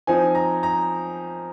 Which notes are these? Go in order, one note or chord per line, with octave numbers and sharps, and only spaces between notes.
F3 C4 D#4 G#5
A#5
A#5